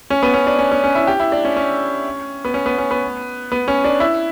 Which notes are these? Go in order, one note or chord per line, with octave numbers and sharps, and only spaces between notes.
C#4
B3
C#4
D4
C#4
C#4
C#4
E4
G4
E4
D4
C#4
C#4
B3
C#4
B3
C#4
B3
B3
C#4
D4
E4